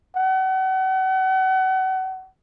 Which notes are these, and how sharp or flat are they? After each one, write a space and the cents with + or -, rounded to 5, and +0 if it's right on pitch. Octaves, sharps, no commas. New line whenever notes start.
F#5 +35